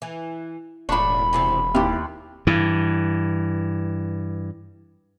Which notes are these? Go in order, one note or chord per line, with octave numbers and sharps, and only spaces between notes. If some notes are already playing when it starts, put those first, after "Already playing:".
E3
E1 A2 D4 B5 C#6
E2 C3 C4
D#2 E4 G4
G2 E3